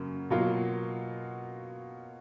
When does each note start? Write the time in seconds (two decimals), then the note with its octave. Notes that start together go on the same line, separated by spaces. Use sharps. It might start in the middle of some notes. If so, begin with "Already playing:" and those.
Already playing: F#2 C#3 F#3 A#3
0.30 B2 F#3 A#3 F4